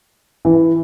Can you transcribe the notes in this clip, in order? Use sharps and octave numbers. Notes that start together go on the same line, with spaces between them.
E3